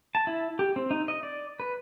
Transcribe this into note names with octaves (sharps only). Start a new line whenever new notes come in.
A5
E4
G4
C4
D#4
D#5
D5
B4